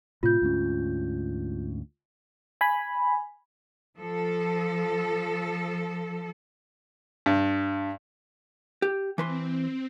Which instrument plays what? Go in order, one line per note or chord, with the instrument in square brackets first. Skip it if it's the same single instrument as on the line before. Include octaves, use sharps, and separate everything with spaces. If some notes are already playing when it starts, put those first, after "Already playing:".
[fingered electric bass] A2 C3 [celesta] F4 G6
[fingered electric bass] D2 G#2 C#4
[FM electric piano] G#5 B5
[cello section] F3 A4
[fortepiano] G2
[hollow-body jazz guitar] G4
[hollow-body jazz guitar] E3 B4 C6 [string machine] C4